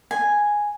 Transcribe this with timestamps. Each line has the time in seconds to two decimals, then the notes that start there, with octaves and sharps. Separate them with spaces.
0.11 G#5